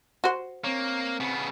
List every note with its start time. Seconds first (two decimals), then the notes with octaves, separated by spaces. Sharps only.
0.24 F#4 C5
0.64 A#3 C4 C#5
1.20 C#3 B3